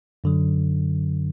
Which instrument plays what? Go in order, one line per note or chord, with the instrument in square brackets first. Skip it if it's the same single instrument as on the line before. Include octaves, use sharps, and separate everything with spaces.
[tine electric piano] F#2 D3 F#3